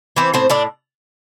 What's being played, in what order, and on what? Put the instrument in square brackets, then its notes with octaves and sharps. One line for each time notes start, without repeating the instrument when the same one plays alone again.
[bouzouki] E3 C4 C5
A2 C4 C5
A2 D4 D5